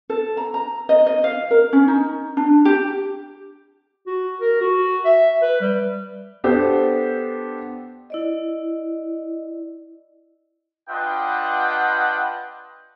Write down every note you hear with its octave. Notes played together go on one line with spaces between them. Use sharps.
A4
A#5
A#5
D#5
D#5
F5
A#4
C#4
D#4
D4
G4
F#4
A#4
F#4
E5
B4
G3
B3 D4 G4 A4 C5
E4 D5 D#5
D4 F4 B4 D#5 F#5 G5